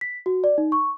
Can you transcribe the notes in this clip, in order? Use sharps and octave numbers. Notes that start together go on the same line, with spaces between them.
B6
F#4
D5
D#4
C#6